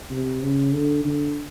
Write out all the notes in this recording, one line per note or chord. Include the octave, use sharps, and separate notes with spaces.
C3
C#3
D3
D3